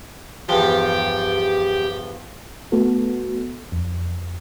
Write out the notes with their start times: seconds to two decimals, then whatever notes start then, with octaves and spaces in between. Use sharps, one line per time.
0.49 E2 G2 F3 G4
2.72 A3 B3 F#4 A4
3.72 F2